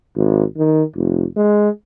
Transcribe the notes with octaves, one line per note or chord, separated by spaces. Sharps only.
G#1
D#3
F1
G#3